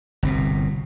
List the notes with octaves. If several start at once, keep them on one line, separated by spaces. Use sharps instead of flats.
G1 C2 B2